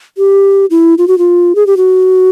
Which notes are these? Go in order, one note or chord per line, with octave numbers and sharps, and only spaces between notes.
G4
E4
F4
F#4
F4
G#4
G4
F#4